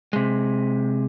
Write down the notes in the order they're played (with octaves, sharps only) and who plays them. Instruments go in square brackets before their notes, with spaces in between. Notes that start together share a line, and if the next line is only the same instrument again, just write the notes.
[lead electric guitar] C3 G#3